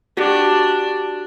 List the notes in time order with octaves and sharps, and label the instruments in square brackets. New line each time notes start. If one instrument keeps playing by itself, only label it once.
[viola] D4 [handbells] F#4 G4